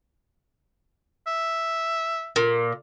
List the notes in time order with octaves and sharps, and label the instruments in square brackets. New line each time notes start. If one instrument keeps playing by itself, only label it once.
[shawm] E5
[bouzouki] A#2